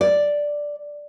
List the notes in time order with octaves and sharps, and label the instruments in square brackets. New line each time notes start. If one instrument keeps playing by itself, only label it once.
[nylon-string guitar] D5